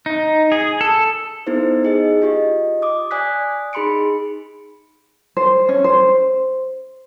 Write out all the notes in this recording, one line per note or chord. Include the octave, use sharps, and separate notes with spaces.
D#4
G#4
A4
B3 D#4 E4 A4 C5
D#4 G#4 D#5
F4 G4 D#5
D6 D#6
D5 G#5 D#6 F#6 B6
D#4 G#4 B5 C6 C#7 D7
C5
C#4
C5